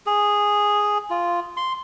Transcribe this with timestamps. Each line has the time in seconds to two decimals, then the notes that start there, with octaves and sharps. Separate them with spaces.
0.07 G#4
1.10 F4
1.57 C6